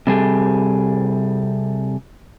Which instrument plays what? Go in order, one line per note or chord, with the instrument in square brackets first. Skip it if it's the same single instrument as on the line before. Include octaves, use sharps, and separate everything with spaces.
[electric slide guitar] C3 G3 G#4 A4